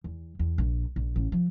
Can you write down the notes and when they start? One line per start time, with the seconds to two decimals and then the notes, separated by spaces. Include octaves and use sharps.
0.04 E2
0.39 E2
0.58 A#1
0.96 A#1
1.16 A1
1.32 F3